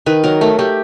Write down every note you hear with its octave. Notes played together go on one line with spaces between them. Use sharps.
D#3 B4
F#3 A#4
A3 A#4
A3 G4